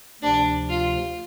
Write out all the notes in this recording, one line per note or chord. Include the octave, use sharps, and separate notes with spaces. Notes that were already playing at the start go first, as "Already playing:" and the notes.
D2 C3 F3 D4
F4